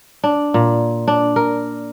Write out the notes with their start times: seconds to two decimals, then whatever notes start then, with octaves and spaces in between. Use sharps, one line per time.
0.24 D4
0.54 A#2
1.08 D4
1.36 A#4